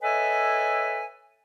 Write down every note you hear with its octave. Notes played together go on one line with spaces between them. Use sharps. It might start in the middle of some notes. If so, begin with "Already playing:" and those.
A4 B4 C#5 D#5 E5 G#5